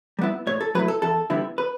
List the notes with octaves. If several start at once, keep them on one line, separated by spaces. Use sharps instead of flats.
G3 B3 E4
A2 C#5
A4
F#3 A3 E4 B4
A4
E2 A4
D3 G3 B3 E4
B4